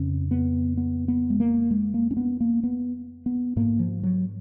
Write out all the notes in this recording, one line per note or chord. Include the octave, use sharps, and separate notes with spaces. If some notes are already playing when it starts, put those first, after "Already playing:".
Already playing: F2 C#3 C#4
B3
B3
B3
G#3
A#3
G#3
A#3
C#4
B3
A#3
B3
B3
G#2 A#3
F3
F#3